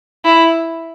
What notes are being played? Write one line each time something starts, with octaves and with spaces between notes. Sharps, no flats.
E4